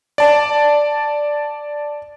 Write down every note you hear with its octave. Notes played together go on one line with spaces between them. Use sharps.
D5 A5